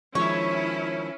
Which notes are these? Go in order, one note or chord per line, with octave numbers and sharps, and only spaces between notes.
D#3 F3 G#3 C#4 E4 C#5